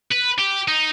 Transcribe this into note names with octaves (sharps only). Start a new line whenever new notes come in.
B4
G4
D#4